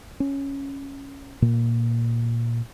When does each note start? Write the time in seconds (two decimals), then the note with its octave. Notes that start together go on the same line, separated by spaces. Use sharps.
0.20 C#4
1.42 A#2